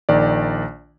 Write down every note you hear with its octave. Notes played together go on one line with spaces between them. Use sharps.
A#1 D#3 D5